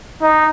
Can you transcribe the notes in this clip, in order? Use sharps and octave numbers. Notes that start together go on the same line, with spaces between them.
D#4